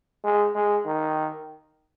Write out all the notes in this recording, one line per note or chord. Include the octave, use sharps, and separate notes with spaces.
G#3
G#3
D#3